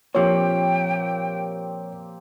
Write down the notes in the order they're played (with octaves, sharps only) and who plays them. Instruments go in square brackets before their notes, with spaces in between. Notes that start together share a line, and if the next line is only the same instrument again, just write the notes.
[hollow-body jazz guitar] A#2 F3 [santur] A#3 C4 G4 [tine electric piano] C#5 [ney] G5